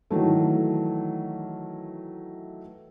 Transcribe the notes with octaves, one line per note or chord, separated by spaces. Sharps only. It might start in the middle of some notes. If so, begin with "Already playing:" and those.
D#3 E3 F#3 A3